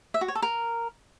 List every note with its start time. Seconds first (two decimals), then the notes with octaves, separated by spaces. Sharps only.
0.14 E5
0.21 F#4
0.28 C#5
0.35 A4
0.42 A#4